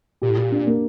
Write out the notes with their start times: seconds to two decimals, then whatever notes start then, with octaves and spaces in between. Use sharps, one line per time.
0.22 A#2 G4
0.30 A2
0.37 A#2 G4
0.52 D4
0.67 A#3